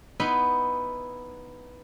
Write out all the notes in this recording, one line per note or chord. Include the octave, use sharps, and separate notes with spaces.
B3 D#4 E4 B5 C6